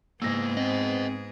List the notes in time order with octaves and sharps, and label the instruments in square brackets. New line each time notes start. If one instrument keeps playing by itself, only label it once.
[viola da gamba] G#2 B3 G#4 [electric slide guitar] A#3 E4 [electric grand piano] E6 A#6
[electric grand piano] C4 [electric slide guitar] B4 D#5